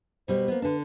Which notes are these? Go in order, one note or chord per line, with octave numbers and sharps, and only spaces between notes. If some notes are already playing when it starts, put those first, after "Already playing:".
B2 G3 C5
A#3 B3
D3 D4 B4